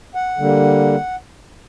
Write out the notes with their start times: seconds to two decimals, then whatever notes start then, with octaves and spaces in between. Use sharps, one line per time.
0.15 F#5
0.38 D3 G3 A#3